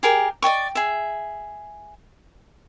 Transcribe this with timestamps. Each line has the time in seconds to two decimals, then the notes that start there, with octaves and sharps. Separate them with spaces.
0.03 G4 G#4 A#4 G5
0.42 D5 D#5 G5 C#6
0.75 G#4 E5